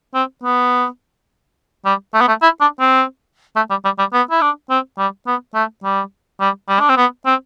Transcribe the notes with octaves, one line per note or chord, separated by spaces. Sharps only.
C4
B3
G3
A3
B3
A3
E4
D4
C4
A3
G3
G3
G3
B3
E4
D4
C4
G3
B3
A3
G3
G3
G3
D4
C4
B3
C4